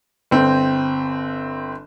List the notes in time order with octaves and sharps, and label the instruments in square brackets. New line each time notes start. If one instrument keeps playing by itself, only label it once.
[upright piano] G1 C4